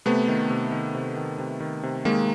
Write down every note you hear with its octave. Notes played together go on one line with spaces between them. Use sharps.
C3 A3 B3
D#3
C3
D#3
C3
D#3
C3
D#3
C3
D#3 G#3 A#3